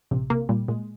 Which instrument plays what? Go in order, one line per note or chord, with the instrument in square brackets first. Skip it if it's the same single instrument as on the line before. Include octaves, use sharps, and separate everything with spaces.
[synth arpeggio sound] A#1 [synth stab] C3
[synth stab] C3 [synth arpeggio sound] A#3
[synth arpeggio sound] A#2 [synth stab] G3
[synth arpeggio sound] A#2 [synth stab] G#3